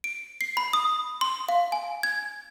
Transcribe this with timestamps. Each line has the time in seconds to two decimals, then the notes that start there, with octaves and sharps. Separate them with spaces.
0.04 D7
0.41 C7
0.57 B5
0.73 D#6
1.21 C6
1.49 F5
1.72 G#5
2.03 G#6